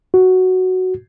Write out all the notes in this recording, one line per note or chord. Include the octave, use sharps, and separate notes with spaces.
F#4